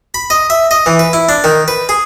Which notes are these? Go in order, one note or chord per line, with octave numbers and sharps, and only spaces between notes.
B5
D#5
E5
D#5
E3
B4
E4
D4
D#3
B4
G#4